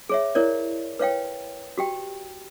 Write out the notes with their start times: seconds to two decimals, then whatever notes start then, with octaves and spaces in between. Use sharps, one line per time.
0.09 G#4 C#5 E5
0.35 E4 A#4 C#5 D5
0.99 B4 C#5 F5 G5
1.78 F#4 G4 G5